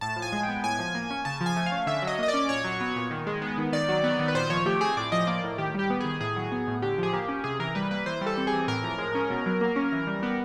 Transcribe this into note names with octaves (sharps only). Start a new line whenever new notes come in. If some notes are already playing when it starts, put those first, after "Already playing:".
A2 A5
F3
G#5
G#3
G5
B3
A2 G#5
F3
A#3
C#4
C#3 A5
F3
G#5
A3
F5
C#4
D3 E5
F#3
D#5
A#3 D#5
D5
C#4
A#2 C#5
F#3
B3
A#2
D#3
G#3
B3
D#3
D#3 D5
F#3
B3
D#3
B4
A#2 C5
F3 C#5
A3 G4
C4 G#4
A2 D5
F3 D#5
A#3 D5
A2
D#3 G4
G3 G4
B3
D#3 G#4
A2 G#4
F#3
B3
A2
D3 G4
F3 G#4
A#3 G4
C#4
C3 G#4
E3 A#4
G3 B4
A#3 B4
E3 C5
G3
A4
C4
G#4
E3
A2 A#4
F3
G#3
C#4
B2
F#3
A#3
C#4
E3
G3
B3